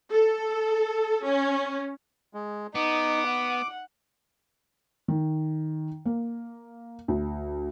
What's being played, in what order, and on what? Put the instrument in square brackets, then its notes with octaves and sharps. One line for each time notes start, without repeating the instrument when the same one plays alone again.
[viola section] A4
C#4
[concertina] G#3
[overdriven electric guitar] B3 [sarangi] D#4 [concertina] D6
[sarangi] F#5
[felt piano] D#3
A#3
D2